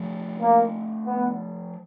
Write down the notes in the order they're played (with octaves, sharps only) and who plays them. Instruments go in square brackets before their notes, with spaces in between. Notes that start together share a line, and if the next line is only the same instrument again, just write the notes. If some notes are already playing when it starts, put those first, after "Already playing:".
Already playing: [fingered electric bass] F3 A3 D4
[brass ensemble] A#3
B3